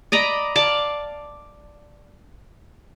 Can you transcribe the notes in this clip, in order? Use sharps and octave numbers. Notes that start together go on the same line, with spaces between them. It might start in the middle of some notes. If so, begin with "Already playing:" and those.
D5 D#5 A#5 B5
D5 F5 A5